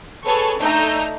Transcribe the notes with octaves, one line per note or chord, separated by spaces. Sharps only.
G#4 A4 B4 C#5 A5 C#6
A3 D4 D#4 A#5 E6 G6